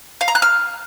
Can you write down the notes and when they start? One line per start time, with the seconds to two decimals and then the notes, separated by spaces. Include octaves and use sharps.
0.21 F5
0.28 A#5
0.35 F#6
0.42 F6